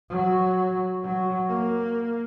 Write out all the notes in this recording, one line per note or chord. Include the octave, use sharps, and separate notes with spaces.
F#3
F#3
A#3